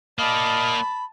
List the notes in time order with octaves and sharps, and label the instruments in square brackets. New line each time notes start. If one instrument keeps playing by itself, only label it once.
[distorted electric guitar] A#3 D5 [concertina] D#5 F5 [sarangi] A5 [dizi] B5